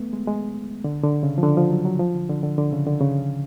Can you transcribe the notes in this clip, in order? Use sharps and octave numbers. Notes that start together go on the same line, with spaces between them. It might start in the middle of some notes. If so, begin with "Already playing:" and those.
Already playing: A3 B3
G#3
G#3
D3
D3
C#3
F3
D3
F3
F#3
F#3
F3
D3
D3
D3
D3
C#3
D3
C#3